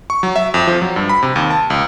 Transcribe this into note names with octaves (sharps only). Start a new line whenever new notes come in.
C#6
F#3
E5
F2
F3
F#3
G2
B5
C3
D#2
A5
C#2